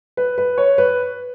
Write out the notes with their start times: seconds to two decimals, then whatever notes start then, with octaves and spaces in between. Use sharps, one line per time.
0.17 B4
0.38 B4
0.58 C#5
0.78 B4